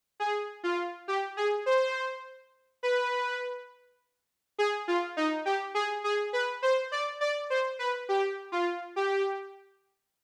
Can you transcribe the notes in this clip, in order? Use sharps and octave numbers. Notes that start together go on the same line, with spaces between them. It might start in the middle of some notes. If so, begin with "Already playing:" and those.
G#4
F4
G4
G#4
C5
B4
G#4
F4
D#4
G4
G#4
G#4
B4
C5
D5
D5
C5
B4
G4
F4
G4